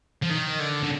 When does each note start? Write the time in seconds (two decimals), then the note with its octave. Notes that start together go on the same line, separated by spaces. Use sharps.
0.22 F3
0.30 D#3
0.60 D3
0.84 D3